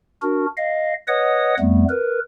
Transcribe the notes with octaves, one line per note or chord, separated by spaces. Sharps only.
D4 F#4 A#4
D#5 F5
B4 C#5 D#5 F#5 D#6
F2 G3 A3 B3
A#4 B4